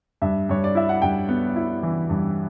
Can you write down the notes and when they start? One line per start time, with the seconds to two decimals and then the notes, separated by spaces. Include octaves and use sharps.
0.22 G2 E5
0.49 G2 C#5
0.64 D5
0.75 E4 E5
0.89 F#5
1.02 G2 G5
1.29 B3
1.56 E4
1.83 E3
2.10 G2